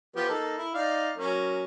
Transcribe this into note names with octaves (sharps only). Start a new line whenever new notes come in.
F3 B3 G4
A#3 D#4 A4
E4
D#4 D5 F5
F#3 A#3 C#4